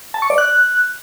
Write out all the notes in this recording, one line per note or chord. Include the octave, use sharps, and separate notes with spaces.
A5
C#6
D5
F#6